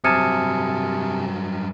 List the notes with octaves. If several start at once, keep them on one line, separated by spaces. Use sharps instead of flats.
G2 C3 F#3 G#5 A5 D#6 F6 C#7